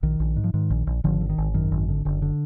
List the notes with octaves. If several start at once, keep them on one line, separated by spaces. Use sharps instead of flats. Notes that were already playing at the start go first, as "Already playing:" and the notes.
A#1 D#3
A#1
G#2
F3
G#2 D#3
A#1
A#1
G#1 D3 F3
D3
D#3
G#1
F#2 D#3
G#1
D3
F#1 D3
D3